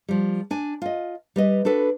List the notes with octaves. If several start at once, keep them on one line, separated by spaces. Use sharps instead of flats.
F3 G3
D4 G#5
F4 D#5
G3 B4 D#5
D4 F#4 A4 B4